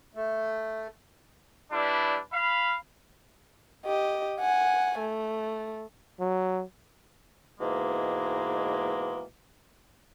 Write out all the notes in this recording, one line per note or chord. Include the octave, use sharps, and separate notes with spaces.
A3
G3 D4 E4 B4
F5 B5
G4 D#5
F#5 G#5
A3
F#3
G#2 B2 E3 G#3 A#3